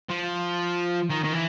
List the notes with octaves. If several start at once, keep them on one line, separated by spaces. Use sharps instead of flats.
F3
D#3
D#3
E3